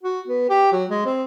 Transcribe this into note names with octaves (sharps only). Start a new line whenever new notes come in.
F#4
B3
G4
F#3
G#3
C4